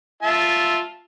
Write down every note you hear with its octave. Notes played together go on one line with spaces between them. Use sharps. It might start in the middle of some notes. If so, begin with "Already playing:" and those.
F4 E5 A5